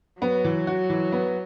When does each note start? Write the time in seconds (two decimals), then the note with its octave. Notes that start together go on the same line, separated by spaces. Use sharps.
0.21 F#3 B3
0.44 E3
0.67 F#4
0.90 E3
1.12 B3